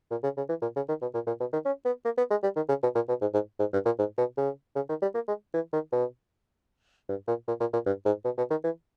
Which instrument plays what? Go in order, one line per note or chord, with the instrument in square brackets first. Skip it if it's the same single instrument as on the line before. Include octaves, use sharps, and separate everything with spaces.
[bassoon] A#2
C#3
C#3
E3
A#2
C#3
D#3
B2
A#2
A#2
B2
D#3
C#4
B3
A#3
B3
G#3
G3
D#3
C#3
B2
A#2
B2
G#2
G#2
G#2
G2
A#2
G#2
B2
C#3
C#3
D#3
G3
A#3
G#3
E3
D#3
B2
G2
A#2
A#2
A#2
A#2
G2
G#2
B2
B2
D#3
E3